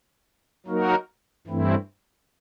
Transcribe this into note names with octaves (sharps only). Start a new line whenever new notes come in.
F#3 A#3 D#4 F#4 A#4
G2 E3 A3 C4 E4